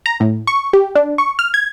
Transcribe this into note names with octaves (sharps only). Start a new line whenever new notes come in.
A#5
A2
C#6
G4
D4
C#6
F6
G#6